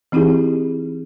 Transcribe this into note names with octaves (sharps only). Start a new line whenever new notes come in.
E3 C4 D#4 E4 G4 G#4